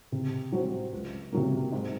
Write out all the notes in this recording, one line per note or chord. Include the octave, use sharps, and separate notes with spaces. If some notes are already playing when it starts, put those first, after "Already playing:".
C3
F#3 C4 F#4 C5
C#2
C3 F#3 A#3
G#2